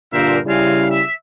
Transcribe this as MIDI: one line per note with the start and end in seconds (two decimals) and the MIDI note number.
0.13 0.38 43
0.13 0.38 46
0.13 0.38 50
0.13 0.37 70
0.13 0.37 72
0.13 0.37 76
0.46 1.00 49
0.46 1.00 55
0.46 0.84 60
0.46 1.00 64
0.46 0.84 77
0.46 0.84 80
0.88 1.11 76